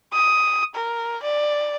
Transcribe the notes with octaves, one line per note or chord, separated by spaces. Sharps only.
D#6
A#4
D5